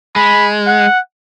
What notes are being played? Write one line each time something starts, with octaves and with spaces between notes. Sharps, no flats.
G#3 B5
F#5